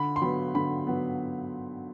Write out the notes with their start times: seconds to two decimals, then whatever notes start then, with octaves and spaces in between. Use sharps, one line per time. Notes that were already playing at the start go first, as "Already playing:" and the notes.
Already playing: D3 B5
0.16 C6
0.22 F#3 B3 B5
0.55 D3 B5
0.87 F#3 B3